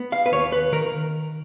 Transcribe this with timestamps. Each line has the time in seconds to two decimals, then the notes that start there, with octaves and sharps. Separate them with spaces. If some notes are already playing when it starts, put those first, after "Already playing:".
Already playing: B3
0.12 F5
0.26 B4
0.32 D#2 C#5
0.52 B4
0.72 D#3 A#4